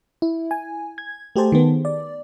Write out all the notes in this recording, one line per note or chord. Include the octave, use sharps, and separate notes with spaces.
E4
G#5
G#6
A3 G4 G#4 C5 A5
D#3 B3
D5